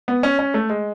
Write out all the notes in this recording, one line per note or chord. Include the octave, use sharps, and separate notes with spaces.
B3
C#4
C#4
A3
G#3